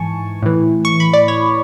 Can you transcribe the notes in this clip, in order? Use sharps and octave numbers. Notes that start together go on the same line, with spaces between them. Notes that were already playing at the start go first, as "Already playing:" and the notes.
Already playing: G#2 E3 G#5 A5 C#6
A2 E3
C#6
B5
D5
C#5